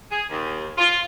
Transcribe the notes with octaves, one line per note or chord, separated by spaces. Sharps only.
G#4
D#2
F4